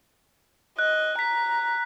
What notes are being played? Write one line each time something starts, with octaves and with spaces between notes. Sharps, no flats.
D#5 F#6
A#5 B6